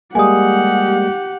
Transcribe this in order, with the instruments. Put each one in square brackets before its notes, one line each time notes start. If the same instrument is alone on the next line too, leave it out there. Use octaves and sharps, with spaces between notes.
[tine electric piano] G3 G#3 A#3 [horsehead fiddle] G4 F#5 [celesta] G#5 D#6